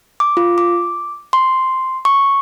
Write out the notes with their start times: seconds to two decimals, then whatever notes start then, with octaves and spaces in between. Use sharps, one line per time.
0.20 D6
0.37 F4
0.58 D6
1.33 C6
2.05 C#6